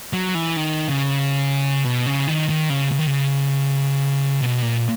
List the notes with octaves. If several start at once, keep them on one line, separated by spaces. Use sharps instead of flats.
F#3
E3
D#3
C#3
B2
C#3
D#3
D#3
C#3
C#3
D#3
C#3
B2
A#2